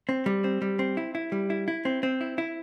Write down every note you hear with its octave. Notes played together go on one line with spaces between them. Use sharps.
C4
G3
C4
G3
C4
E4
E4
G3
E4
E4
C4
C4
E4
E4